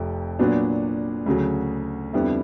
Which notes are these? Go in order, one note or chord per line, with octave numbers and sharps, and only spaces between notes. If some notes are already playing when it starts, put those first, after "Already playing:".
Already playing: F1 F2 C3
A#2 F#3 B3 D4
D2 C#3 F#3
F2 D3 G3 B3 E4